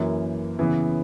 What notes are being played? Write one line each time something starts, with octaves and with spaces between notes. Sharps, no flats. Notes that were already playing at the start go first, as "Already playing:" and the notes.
Already playing: F#2 E3 A#3
C#3 E3 B3